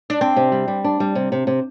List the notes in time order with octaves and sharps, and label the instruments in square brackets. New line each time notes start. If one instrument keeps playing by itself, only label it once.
[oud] D4
[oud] C4 [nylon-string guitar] D4
[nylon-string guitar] C3
G3
G3
D4
G3
C3
C3
C3